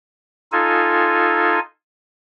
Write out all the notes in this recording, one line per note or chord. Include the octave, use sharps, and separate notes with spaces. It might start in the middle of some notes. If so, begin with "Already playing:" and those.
D#4 F4 A4 G#5